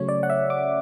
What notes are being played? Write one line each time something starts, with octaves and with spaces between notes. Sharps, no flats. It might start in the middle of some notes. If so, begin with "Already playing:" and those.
Already playing: C#3 F#3 A3 C#4 C#5
D5
F#5
E5
D6